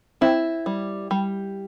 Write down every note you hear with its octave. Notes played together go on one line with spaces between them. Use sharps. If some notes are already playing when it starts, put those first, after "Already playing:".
C4 E4
G3
G3